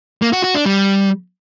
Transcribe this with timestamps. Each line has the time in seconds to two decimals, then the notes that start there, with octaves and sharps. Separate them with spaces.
0.22 A#3
0.33 F#4
0.44 F#4
0.55 D4
0.65 G3